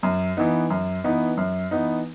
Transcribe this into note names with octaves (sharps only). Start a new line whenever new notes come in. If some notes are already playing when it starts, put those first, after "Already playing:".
F#2
E3 B3 D#4
F#2
E3 B3 D#4
F#2
E3 B3 D#4